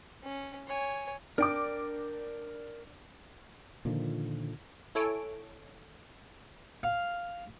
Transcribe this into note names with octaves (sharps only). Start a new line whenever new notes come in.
C#4
C#5 G#5
D4 A#4 G5 D6
A#2 D3 D#3 F3
E4 A4 C#5 G#5 D7
F5